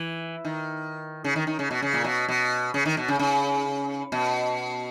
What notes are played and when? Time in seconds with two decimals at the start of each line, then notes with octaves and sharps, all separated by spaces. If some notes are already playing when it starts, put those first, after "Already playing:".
Already playing: E3
0.45 D#3
1.24 C#3
1.36 D#3
1.47 D#3
1.59 C#3
1.71 B2
1.82 C#3
1.93 A#2
2.04 B2
2.28 B2
2.74 C#3
2.86 D#3
2.97 B2
3.08 C#3
3.19 C#3
4.12 B2